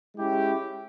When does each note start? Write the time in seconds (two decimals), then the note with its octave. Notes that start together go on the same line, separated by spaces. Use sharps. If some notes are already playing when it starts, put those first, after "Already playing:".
0.15 G#3 C#4 E4 G4